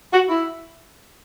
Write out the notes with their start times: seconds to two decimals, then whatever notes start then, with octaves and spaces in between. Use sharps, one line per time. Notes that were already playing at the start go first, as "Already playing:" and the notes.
0.13 F#4
0.29 E4